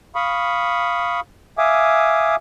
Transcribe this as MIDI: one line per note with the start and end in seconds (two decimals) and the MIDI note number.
0.15 1.20 77
0.15 1.20 83
0.15 1.20 85
0.15 1.20 87
1.58 2.36 76
1.58 2.36 77
1.58 2.36 80
1.58 2.36 86
1.58 2.36 87